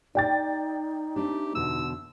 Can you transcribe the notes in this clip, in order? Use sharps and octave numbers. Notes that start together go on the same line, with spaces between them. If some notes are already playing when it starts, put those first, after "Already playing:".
D#4 G4 D5 G5 A6
A3 C4 D4 G4
E2 B2 D3 E6